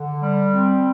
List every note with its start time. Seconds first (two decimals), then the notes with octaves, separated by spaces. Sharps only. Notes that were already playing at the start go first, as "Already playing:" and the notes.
Already playing: D3
0.22 G3
0.53 C4